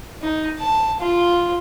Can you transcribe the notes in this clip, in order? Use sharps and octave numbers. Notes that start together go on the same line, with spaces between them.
D#4
A5
F4